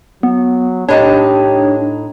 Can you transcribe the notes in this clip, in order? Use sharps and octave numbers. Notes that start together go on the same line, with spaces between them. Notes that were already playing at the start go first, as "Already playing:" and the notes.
F#3 B3
A2 D4 D#4 G4 C#5 A5